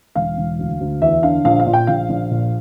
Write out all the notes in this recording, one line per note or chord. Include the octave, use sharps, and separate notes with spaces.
E1 F5
E1
D2
D2
E2 E5
D3 F5
A#1 F5
F5
A#2
G5
A#1 F5
A#1
A#2